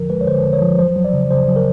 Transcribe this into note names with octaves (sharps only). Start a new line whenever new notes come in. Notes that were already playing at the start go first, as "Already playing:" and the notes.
Already playing: D3 F3 A#4
G#3 B4
C#5
D3 C5
D3
C#5
F3
F#3 C5
F#3
D5
C#3
C#3 C5
F#3
A#4